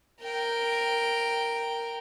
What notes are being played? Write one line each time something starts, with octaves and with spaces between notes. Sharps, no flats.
A#4 G5